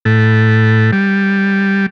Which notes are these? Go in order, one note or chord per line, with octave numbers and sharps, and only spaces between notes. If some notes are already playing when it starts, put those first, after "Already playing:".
A2
G3